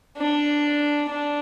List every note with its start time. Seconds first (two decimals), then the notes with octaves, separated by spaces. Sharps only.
0.17 D4
1.10 D4